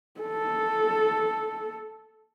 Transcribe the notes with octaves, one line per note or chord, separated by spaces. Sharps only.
A4